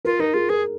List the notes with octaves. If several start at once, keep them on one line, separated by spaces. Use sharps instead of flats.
F4 A#4
D#4 A#4
F4 G#4
G#4 A#4